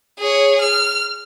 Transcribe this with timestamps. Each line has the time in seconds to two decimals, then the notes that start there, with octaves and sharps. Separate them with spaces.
0.20 G#4 C#5
0.61 F6